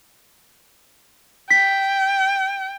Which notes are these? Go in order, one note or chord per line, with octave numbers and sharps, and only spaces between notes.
G5 B6